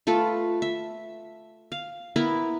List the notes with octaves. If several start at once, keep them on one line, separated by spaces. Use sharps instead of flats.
A3 F4 A4 B4
E5
F5
B3 E4 A#4 E5